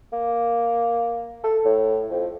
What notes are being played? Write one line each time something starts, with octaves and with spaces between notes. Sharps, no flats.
A#3
A4
A2
F2